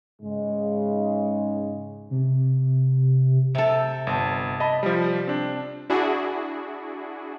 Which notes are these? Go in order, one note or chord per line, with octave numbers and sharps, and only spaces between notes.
G#2 C#3 G#3
C3
C3 A4
G1 A5
D#5 A5 B5
F3 G3
C4 D4
D4 E4 F#4 G#4